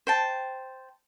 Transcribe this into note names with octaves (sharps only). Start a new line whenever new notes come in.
C5 G5 A5